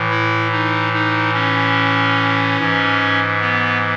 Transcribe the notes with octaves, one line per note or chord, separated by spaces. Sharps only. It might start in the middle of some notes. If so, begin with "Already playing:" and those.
Already playing: A2 E3
E4
D#4
D#4
C#4
G#2 E3
B3